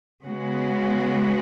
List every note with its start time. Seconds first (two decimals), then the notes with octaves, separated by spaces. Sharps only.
0.25 C#3 G#3 B3 F#4